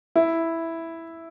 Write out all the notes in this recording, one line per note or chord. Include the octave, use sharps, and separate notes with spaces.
E4